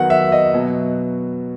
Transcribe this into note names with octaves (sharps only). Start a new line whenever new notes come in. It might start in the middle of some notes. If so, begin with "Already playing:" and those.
Already playing: D#3 F#3 B3 F#5
E5
D#5
B2 F#3 B3